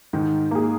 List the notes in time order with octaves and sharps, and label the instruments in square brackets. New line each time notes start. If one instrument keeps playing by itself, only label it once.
[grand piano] G#2 [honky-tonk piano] D#3
[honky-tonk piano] A#3 G#4